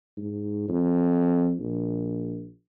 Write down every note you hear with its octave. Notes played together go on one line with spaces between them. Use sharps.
G#2
F2
A#1